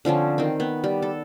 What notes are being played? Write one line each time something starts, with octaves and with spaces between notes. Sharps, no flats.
D3 F3 C4 C#4
D#3 C4
B3
G3
A4